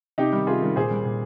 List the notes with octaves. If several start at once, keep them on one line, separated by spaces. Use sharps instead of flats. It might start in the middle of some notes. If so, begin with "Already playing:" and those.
C3 D#4 G4
D#3 G3
C3 F4 G#4
D#3 G3
A#2 G#4 C5
G3
A#2